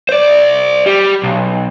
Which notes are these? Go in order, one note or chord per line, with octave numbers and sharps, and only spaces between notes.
C5 D5
G3
B1